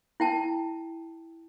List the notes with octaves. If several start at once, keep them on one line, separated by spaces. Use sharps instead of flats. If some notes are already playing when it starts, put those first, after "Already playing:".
E4 G5 A5